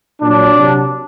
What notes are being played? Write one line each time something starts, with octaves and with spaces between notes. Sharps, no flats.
A#2 F#3 D4
C3 F#3